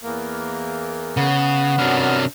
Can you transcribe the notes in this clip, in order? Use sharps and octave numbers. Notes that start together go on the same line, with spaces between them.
E2 A#3
C#3 B3
F#2 C3 F#3 D4 F6